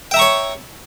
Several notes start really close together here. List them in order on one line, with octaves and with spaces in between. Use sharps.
G5 E5 A#5 C#6 C#5